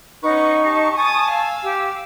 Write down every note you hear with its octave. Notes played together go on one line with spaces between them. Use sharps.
C#4 D#4 B4 F#5 C#6
G4 A5
G#5 A5 D#6 A6
F5 E6
G4